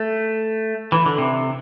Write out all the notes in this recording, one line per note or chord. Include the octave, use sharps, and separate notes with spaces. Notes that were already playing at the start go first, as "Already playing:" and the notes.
Already playing: A3
E3
D3
C3